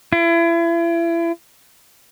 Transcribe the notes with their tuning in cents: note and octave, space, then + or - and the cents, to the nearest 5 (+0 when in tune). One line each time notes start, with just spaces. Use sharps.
E4 +35